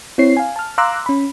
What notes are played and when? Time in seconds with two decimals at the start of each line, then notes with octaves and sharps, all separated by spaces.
0.18 C4 E4 C#5 C7
0.37 F5 G#5
0.56 A5 F6
0.78 F5 A#5 C6 D6 E6 F#6
1.06 C#4 B5